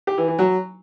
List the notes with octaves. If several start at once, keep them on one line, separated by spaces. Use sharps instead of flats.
G4
E3
E3
F#3